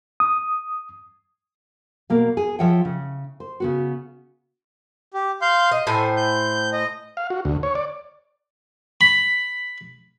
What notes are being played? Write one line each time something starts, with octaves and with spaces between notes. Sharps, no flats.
D#6
B2 A#3 F5
G#4
F3 C#5 E5 F#5 G5
C#3
C5
C#3 B3 F#4
G4
F5 C6 G6
D#5
A2 A4 C5 G#5
G6
D#5
F5
F#4
D2
C#5
D5
B5